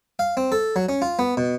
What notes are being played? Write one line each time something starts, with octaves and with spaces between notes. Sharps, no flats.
F5
C4
A4
F#3
C#4
F4
B3
B2